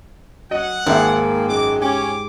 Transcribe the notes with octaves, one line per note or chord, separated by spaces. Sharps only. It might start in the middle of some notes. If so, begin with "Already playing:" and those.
F#3 D#5 F#5
G#1 G#2 A#3 G#4 E5
F#2 G#3 D6
C#4 G4 D6